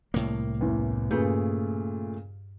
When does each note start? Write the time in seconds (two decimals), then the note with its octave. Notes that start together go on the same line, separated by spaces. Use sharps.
0.14 C2 A2 A#3
0.61 A1 E2
1.11 G2 A#2 C#3 A3 G#4 B4 G6